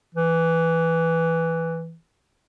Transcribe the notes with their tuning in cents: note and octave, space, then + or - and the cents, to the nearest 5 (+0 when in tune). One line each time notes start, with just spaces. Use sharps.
E3 +0